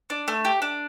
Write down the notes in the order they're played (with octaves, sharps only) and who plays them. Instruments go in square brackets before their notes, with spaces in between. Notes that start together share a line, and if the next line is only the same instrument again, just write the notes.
[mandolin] D4
A3
G4
D4